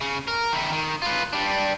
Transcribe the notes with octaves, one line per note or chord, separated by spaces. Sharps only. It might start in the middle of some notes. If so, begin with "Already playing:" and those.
C#3
A#4
D#3 E4
D#3
F4 B4
G3 D4